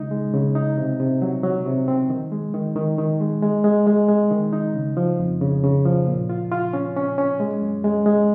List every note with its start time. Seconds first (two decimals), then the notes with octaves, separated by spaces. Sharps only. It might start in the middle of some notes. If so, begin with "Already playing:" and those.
Already playing: C#3 G#3 D#4
0.11 G#3
0.33 C#3
0.55 D#4
0.78 C3
1.00 C3
1.22 F#3
1.44 F#3
1.66 C3
1.88 C4
2.10 D#3
2.32 G#3
2.54 D#3
2.76 D#3
2.98 D#3
3.21 G#3
3.42 G#3
3.64 G#3
3.87 G#3
4.09 G#3
4.31 D#3
4.53 D#4
4.75 C#3
4.97 F3
5.19 F2
5.41 C#3
5.64 C#3
5.85 F3
6.07 A#2
6.29 F4
6.52 F4
6.73 C#4
6.96 C#4
7.18 C#4
7.40 G#3
7.62 F#2
7.84 G#3
8.06 G#3